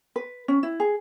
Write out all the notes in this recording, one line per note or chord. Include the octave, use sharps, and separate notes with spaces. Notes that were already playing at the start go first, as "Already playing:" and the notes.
B4
C#4
E4
G#4